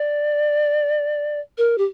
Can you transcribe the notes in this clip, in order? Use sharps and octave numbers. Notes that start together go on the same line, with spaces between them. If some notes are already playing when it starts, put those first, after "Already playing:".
Already playing: D5
A#4
G4